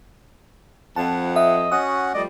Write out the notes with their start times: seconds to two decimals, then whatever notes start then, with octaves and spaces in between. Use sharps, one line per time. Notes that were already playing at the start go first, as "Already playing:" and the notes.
0.96 F2 F#5 A5
1.36 D#5 E5
1.72 C#4 F#4 F#5 D#6
2.14 F3 G3 A3 D5 D#5